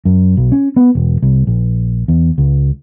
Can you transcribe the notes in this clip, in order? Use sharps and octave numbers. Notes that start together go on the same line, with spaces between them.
F#2
B1
C#4
B3
E1
C2
A#1
E2
C#2